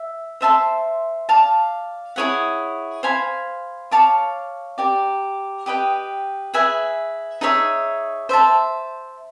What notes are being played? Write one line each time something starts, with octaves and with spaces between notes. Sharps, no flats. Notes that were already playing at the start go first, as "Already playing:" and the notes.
Already playing: E5
C5 E5 A5 C6
D5 F5 A5
E4 G#4 C#5 F#5
C5 F5 G#5 B5
C#5 F5 A5 D6
G4 A#4 D5
G4 B4 D#5 G5
G#4 B4 E5 G#5
D#4 G#4 C#5 E5
C5 E5 A5